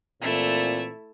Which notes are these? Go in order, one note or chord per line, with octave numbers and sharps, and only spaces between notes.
A#2 E3 A3 C4 E4